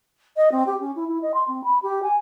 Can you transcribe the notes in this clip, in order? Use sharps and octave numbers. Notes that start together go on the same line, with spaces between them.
D#5
C4
G4
C#4
E4
E4
D#5
C6
C4
B5
G4
G#5